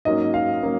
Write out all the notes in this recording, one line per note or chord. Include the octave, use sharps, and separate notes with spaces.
G#2 F#3 A#3 C#4 D#5
F5
F#3 A#3 C#4